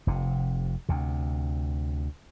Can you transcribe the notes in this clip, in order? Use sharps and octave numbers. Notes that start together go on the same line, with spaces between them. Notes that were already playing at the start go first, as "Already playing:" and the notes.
F1 C3
D2 C3